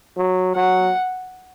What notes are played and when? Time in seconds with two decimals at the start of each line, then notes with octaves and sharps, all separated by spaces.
0.17 F#3
0.56 F#3 F#5